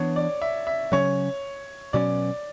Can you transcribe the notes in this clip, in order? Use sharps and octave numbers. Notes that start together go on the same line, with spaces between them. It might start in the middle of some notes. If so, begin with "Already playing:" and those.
Already playing: E3 B3 D4 C#5
D5
E5
E5
C#3 F#3 C#4 C#5
B2 F#3 C#4 D5